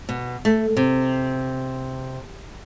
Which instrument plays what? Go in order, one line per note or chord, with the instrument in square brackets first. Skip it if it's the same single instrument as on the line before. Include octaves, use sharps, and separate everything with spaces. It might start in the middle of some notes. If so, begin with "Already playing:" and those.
[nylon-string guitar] B2
A3
C3